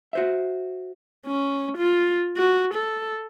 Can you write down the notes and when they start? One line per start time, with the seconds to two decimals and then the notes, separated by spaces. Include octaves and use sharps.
0.13 F#4 C5 E5
1.27 C#4
1.78 F4
2.37 F#4
2.75 A4